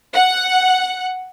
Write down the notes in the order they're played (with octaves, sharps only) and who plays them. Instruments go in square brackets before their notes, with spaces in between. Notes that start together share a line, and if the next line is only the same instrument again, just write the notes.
[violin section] F#5